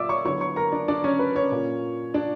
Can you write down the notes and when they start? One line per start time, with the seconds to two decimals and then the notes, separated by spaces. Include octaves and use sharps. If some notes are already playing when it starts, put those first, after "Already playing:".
Already playing: A#2 D5 E5 D6 E6
0.09 C#5 C#6
0.25 D3 F#3 B3 E4 C#5 C#6
0.40 C#5 C#6
0.56 A#4 A#5
0.72 D4 D5
0.88 D4 D5
1.04 C#4 C#5
1.19 B4
1.36 C#4 C#5
1.52 A#2 A#3 C#4
2.14 D4 D5